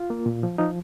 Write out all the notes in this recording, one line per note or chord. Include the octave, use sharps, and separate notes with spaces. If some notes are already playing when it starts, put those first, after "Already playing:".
Already playing: F4
A#3
A#2
F3
F3 D#4